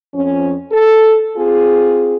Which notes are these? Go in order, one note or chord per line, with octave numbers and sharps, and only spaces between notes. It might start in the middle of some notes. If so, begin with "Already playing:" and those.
F2 F3 C#4
A4
C4 F4 G#4